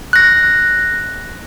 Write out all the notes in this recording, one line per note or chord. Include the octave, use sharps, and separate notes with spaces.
F#6 A#6